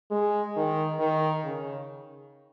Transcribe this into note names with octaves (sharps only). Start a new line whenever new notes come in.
G#3
D#3
D#3
C#3